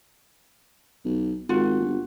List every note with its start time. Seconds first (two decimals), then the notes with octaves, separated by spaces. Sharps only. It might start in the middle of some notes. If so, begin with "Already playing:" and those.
1.05 B1
1.49 G#1 F4 F#4
1.80 G1